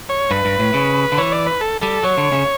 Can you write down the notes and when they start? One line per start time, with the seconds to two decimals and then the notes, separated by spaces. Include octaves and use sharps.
0.09 C#5
0.31 G2 B4
0.45 G2
0.59 A2
0.74 C#3
1.12 D3
1.18 E3 C#5
1.32 D5
1.46 B4
1.61 A4
1.81 G3 A4
2.03 F#3 C#5
2.17 D3
2.32 C#3